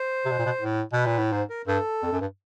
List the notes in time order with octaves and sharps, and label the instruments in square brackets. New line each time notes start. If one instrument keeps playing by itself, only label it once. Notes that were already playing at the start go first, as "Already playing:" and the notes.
Already playing: [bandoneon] C5
[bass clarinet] C3
B2
A#2
B2
A2
[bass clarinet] B2 [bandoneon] B4
[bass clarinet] A#2
A2
[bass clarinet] G#2 [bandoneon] C5
[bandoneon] A#4
[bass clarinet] G2 [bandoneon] A4
[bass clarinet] F2
F#2
G2